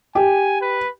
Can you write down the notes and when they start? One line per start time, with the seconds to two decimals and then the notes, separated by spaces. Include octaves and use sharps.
0.15 G4 G#5
0.62 B4